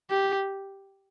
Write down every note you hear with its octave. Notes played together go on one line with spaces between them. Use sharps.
G4